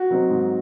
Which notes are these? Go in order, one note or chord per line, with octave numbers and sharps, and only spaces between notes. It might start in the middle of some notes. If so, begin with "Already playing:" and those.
Already playing: F#4
D#3 F#3 C4 D#4
G#2